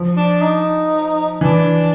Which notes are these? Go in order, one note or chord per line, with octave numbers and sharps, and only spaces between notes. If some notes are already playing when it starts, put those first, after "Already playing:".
Already playing: F3
D4
D#4
E3 D4